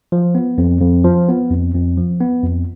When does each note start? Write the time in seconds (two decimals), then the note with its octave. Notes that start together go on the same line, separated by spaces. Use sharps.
0.12 F3
0.35 B3
0.58 F2
0.81 F2
1.04 F3
1.28 B3
1.51 F2
1.74 F2
1.98 F3
2.21 B3
2.44 F2